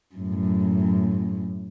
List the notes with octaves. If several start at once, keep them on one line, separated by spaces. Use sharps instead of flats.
F#2 A2